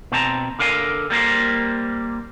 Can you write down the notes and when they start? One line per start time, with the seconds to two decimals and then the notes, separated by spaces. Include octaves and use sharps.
0.12 B2 C4 A5 A#5
0.59 D3 A#4 F5 G#5
1.10 G3 A#3 A#4 C5